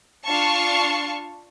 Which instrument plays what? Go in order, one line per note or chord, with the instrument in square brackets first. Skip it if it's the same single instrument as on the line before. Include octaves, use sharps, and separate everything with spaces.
[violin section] D4 F4 F5 A5 C#6